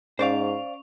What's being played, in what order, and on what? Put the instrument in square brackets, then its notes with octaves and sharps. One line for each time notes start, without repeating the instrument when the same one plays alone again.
[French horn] G#2 [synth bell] C#4 C#6 F7 [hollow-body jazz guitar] C5 D5 F5